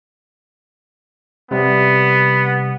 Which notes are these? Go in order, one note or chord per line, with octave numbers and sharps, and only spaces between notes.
C3 G3 B3